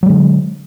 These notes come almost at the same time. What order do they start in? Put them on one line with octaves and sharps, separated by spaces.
F#3 G#3 D3